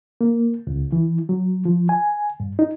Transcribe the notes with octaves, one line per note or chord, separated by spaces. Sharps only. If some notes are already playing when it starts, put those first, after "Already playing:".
A#3
C#2
E3
F#3
F3
G#5
G2
D#4